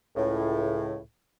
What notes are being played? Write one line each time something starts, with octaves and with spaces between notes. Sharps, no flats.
C#2 A2